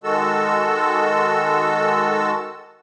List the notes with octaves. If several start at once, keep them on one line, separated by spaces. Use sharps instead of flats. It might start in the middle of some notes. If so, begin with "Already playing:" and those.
D#3 G#3 F#4 A4 E6